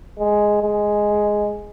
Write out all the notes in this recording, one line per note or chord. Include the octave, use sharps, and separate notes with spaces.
G#3
G#3